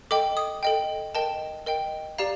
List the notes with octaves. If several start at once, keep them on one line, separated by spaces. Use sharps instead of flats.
A4 D#5 G5 D6
D#6
A4 D#5 G5
A#4 D#5 G5 A5
A#4 D#5 G5
G4 D5 F5 A#5